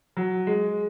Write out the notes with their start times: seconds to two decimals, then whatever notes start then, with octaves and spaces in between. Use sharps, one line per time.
0.17 F#3
0.47 G#3